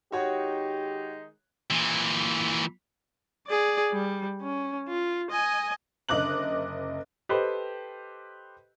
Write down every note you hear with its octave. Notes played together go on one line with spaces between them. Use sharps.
D#3 G#3 D#4 F#4 G4 C#5
A#2 E3
G#4 D5
G3
C#4
F4
D#5 G#5
F#1 D3 D#5 D6 F#6 F#7
G4 A4 B4 C5 D#5